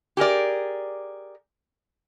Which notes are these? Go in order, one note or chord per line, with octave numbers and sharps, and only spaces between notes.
G4 G#4 A#4 D5